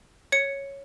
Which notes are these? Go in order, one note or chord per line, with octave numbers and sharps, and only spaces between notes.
C#5 C#7